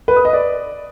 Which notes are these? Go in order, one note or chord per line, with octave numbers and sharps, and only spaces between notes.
B4
D#6
D#5
D5